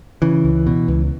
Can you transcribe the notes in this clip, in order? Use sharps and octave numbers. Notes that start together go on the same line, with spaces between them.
C#3 E3
C#2
B2
C#2